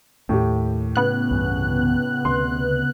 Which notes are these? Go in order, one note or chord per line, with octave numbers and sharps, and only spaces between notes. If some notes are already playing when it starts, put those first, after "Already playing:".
D#2 A2 G4
C#3 B3 F#6
C2 G2 E3
D2 C3 C6